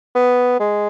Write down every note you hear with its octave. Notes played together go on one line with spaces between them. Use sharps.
B3
G#3